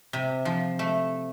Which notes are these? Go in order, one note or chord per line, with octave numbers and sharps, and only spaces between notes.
C3
F3
A3